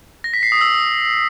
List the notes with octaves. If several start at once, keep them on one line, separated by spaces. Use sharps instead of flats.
A#6
B6
C7
D#6
E6